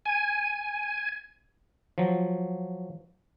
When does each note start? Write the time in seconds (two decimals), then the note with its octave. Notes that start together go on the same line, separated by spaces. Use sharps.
0.06 G#5
1.98 F3 F#3